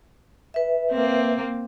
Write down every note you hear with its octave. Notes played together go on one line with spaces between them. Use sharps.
B4 E5
A#3 C4